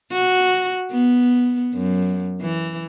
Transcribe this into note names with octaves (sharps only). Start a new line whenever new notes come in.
F#4
B3
F#2
E3